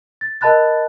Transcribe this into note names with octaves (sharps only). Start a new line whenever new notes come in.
A6
A#4 D#5 A5 B5 F#6 A6